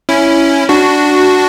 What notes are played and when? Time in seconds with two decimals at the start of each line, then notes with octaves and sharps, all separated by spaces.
0.09 C#4 E4
0.69 D4 F#4